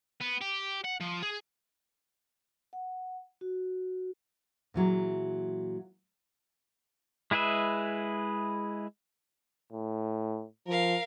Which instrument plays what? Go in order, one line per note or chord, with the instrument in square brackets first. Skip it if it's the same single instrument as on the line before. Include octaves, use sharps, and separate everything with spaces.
[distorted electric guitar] B3
G4
F#5
F3
G#4
[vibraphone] F#5
F#4
[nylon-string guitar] A#2 E3 F#3 G#3
[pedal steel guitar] G#3 E4 G#4 B4 E5
[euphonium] A2
[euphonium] F3 [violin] A#4 F5